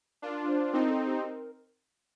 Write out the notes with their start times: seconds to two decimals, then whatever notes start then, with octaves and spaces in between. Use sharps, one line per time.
0.22 D4 F4 A#4
0.48 C5
0.73 C4 D#4 A#4
0.90 A4
1.07 G4
1.24 A#4